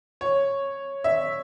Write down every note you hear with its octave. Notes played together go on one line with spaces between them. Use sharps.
C#5
E5